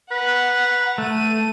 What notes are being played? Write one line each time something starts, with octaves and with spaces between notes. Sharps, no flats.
B4 F#5 A#5
A3 D#7